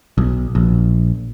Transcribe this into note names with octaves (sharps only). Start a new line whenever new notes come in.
B1
A#1